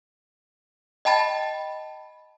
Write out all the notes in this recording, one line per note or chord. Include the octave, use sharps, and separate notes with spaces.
D#5 G5 A5 B5 A6